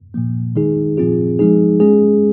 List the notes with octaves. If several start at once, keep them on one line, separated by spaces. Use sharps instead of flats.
A#2 F3 A#3
D#3 G#3 D#4 G#4
A#2 F3 C4 F4 G#4
F3 G#3 D#4 G#4
G#3 C#4 G#4